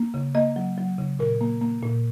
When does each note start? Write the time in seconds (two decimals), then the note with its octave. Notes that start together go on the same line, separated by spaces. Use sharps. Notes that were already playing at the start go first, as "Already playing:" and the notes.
Already playing: A#3
0.14 C#3
0.35 A#3 D#5
0.56 F#3
0.78 F#3
0.98 C#3
1.19 A#2 A#4
1.41 A#3
1.61 A#3
1.83 A#2